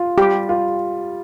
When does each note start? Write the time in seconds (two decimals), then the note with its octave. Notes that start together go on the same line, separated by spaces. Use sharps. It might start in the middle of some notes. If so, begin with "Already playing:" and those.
Already playing: F4
0.18 G3 G4
0.49 F4